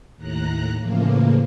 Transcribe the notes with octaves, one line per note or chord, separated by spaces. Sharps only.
D#2 A2 A#5 F#6
A2 C#3 E3 F3 A#3